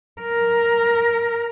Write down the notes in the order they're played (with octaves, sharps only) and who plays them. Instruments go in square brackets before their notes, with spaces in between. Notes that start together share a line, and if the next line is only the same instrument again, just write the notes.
[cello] A#4